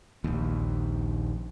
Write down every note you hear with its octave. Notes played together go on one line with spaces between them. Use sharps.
A#1 D#2